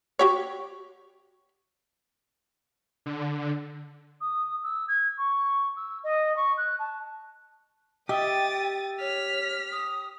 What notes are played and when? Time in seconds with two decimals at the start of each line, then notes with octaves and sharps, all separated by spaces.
0.19 F#4 G4 C#5
3.06 D3
4.20 D#6
4.63 E6
4.88 G#6
5.17 C#6
5.76 E6
6.03 D#5
6.36 C#6
6.57 F#6
6.79 A5
8.09 G4 D#5 E5 G5 D#6 A6
9.00 C#5 F6 B6
9.72 D#6